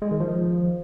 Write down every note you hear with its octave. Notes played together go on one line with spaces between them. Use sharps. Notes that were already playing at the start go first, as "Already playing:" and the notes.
G#3
D#3
F3